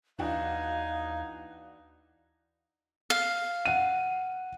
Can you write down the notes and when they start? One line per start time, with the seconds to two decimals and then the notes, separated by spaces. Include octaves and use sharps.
0.19 D#2 E3 D4 D#4 F#4 F5 G#5
3.10 F5
3.66 F#5 D#7